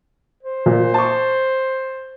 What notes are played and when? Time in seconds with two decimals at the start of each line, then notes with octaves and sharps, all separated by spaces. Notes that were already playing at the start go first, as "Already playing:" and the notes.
0.43 C5
0.66 A#2
0.94 A5 C#6